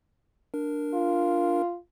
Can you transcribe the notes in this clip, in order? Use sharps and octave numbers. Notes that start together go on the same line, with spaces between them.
D4 A#4
F4